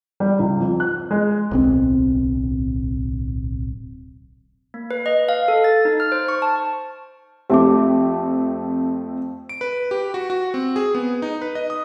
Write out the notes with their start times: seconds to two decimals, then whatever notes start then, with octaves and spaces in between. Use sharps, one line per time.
0.20 G3
0.40 C#2
0.60 F2
0.80 F#6
1.11 G#3
1.51 D1 B1 C4
4.74 A#3
4.91 B4
5.06 D#5
5.29 F5
5.48 A4
5.64 A6
5.85 D#4
6.00 F6
6.12 C5
6.28 C#6
6.42 A5
7.50 F2 A3 C4 G4 E5 D6
9.49 D7
9.61 B4
9.91 G4
10.14 F#4
10.30 F#4
10.54 C4
10.76 G#4
10.95 B3
11.22 D#4
11.42 B4
11.55 D#5
11.70 D#6